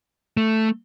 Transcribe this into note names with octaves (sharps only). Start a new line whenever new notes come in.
A3